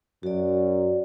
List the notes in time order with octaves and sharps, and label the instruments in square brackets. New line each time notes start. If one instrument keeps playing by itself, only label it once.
[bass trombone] F#2 [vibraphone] F#4 D5